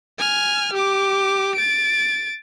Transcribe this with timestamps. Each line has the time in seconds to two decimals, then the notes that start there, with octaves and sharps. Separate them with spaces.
0.19 G#5 F6
0.73 G4 D6
1.55 A6 D7